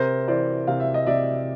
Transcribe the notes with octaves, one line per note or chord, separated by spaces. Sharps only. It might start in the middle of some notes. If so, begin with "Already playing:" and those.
Already playing: C3 A#4 C5
E3 C5 D5
C3 F5
E5
D#5
C3 D5 E5